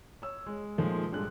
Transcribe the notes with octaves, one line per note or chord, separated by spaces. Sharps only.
C#5 E6
G#3
A#2 D#3 F3 G#3 A3
G2 G3 G#3 A4 F#6